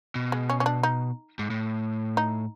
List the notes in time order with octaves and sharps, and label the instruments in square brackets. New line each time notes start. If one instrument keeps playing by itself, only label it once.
[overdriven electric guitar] B2
[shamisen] G#3
C#4
C#4
D4
D#4
[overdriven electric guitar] G#2
A2
[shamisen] D#4